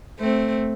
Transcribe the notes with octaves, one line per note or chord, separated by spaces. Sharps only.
A3 C4